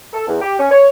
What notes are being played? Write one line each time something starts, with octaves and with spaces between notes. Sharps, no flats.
A4
E2
G4
C#4
C#5